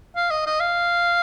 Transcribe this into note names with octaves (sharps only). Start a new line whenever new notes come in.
F5
D#5
D#5
F5